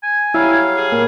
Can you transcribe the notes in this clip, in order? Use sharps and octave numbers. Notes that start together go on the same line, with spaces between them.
G#5
F#3 G3 E4 F5
G#4
A#2